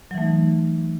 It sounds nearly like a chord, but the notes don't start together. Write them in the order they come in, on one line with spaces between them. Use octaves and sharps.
F#3 E3 A3 D#4